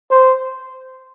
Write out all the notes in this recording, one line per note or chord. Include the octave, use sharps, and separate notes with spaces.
C5